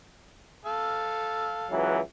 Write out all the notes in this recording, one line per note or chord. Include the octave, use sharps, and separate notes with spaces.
A4 F5
C#2 E3 F#3